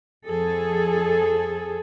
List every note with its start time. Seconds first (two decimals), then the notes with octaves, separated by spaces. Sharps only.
0.25 F2 G#4 A4